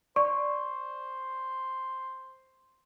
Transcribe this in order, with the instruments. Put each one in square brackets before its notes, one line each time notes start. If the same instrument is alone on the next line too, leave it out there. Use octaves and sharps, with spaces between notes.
[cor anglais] C5 [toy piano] D5 [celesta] C#6